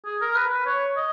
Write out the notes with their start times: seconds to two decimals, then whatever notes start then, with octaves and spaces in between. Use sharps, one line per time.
0.05 G#4
0.22 A#4
0.36 B4
0.51 B4
0.66 C#5
0.97 D#5